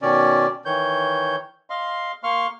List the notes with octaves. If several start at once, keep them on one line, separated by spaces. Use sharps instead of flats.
B2 D#3 C#4 D5
D#3 E3 C#5 G6
D#5 F5 C6
A#3 F5 C6 C#6 F6